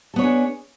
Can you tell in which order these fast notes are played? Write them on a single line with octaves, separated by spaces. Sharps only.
A4 B3 C#5 D4 G#4